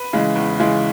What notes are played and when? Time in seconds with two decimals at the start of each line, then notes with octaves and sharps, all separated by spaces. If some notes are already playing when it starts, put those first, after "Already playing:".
Already playing: B4
0.13 C#3 E3 G#3
0.36 E2
0.60 C#3 E3 G#3